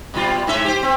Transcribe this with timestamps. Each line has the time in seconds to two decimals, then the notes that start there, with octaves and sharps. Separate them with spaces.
0.14 B2 G3 F4
0.47 G#2 C#4 E5
0.65 G4 C5
0.83 C4